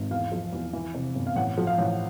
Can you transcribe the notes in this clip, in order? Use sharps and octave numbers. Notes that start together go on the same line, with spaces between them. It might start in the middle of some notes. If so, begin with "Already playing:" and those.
Already playing: G#1
E2 F5
F3
E2
E3
C3
G1
F5
A1 F#5
F3
F5
A1